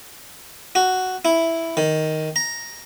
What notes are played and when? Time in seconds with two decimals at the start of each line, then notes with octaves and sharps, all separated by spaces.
0.75 F#4
1.25 E4
1.77 D#3
2.36 A#5